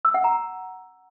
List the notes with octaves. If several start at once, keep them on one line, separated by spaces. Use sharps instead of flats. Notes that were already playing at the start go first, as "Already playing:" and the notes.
E6
F#5
A#5